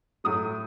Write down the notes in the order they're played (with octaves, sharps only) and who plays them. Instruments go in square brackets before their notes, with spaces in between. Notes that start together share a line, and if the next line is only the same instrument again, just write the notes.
[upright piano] A2 F#3 A3 D#6